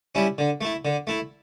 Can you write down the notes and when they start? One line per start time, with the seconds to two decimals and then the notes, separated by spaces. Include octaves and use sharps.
0.15 G3 C#4 E4
0.38 D3
0.61 A3 E4
0.85 D3
1.07 A3 E4